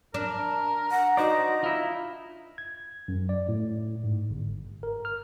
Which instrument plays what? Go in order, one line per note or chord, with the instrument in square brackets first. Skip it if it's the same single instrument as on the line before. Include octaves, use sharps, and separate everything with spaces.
[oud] D4 [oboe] A#4
[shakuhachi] F#5 [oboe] A#5
[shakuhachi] D#4 [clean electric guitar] F#4 C5 D5
[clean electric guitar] E4 F4
[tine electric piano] G#6
F#2
D5
A2
G#2
G1
A#4
F6